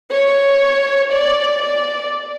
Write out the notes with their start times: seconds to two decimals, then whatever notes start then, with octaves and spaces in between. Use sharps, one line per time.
0.11 C#5
1.12 D5
1.62 D5